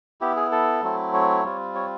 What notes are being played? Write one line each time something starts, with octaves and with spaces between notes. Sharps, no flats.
B3 E4 G4
G#4
A4
F#3 A3 C4 E4
C#5
G3 C4 F4
C#5